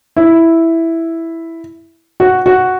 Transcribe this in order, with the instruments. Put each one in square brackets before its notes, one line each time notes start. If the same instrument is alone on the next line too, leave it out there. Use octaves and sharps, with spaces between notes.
[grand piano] E4
F#4
F#4